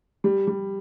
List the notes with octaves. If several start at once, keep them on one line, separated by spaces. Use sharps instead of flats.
G3
G3